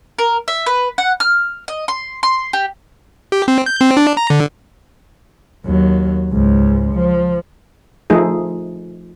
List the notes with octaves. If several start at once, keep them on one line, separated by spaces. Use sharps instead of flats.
A#4
E5
B4
F#5
F6
D#5
C6
C6
G4
G4
C4
G6
C4
D4
A#5
D3
D#2 F#3
C#2 G#2
F3
F3 A3 D#4 G#4